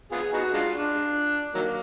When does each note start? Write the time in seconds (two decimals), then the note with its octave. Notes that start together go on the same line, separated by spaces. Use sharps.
0.12 B3 F4 G#4
0.33 B3 D#4 F#4
0.54 G#3 D4 F4
0.74 D4
1.55 D#3 F#3 A#3